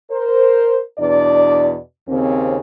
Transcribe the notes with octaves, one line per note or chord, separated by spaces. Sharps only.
A#4 C5
E2 B2 D4 D5
D#2 C#3 C4